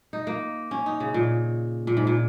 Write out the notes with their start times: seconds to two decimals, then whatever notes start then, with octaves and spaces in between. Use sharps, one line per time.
0.13 D#4
0.27 A#3
0.71 C#4
0.86 D#4
1.00 C#3
1.14 A#2
1.87 A#2
1.97 G#2
2.07 A#2